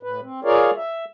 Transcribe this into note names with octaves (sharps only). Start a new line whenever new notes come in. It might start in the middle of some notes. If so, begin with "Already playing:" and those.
A2 B4
C4
F4 G#4 A#4 C#5 D5 F5
E5